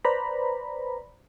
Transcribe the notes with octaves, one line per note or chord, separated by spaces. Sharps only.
B4 C5 D5 A#5 B5